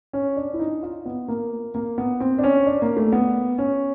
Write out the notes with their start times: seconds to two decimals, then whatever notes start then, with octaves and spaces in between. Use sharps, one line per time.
0.13 C#4
0.37 D4
0.53 E4
0.59 D#4
0.83 F4
1.06 B3
1.28 A#3
1.75 A#3
1.98 B3
2.20 C4
2.39 D4
2.43 C#4
2.67 D4
2.82 A#3
2.97 A3
3.12 B3
3.58 C#4